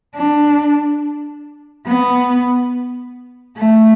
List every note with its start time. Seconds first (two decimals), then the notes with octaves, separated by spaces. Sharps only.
0.16 D4
1.87 B3
3.57 A3